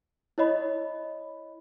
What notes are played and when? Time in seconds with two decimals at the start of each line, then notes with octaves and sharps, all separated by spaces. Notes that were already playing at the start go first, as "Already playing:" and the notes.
0.38 E4 C#5 D#5 B5